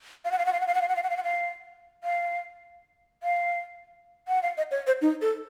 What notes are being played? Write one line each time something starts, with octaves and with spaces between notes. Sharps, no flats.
F5
F#5
F5
F#5
F5
F#5
F5
F#5
F5
F#5
F5
F#5
F5
F#5
F5
F5
F5
F#5
F5
D#5
C#5
C5
D#4
A4